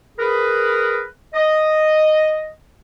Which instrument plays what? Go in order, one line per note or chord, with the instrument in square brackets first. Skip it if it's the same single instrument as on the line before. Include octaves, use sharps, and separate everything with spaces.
[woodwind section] G#4 A#4 B4
D#5